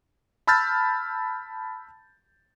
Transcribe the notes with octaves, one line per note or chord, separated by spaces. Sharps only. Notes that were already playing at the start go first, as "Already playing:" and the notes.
A5 B5 E6 F6 G6 A6